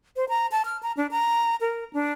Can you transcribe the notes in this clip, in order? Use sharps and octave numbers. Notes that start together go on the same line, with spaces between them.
C5
A#5
A5
F6
A#5
D4
A#5
A#4
D4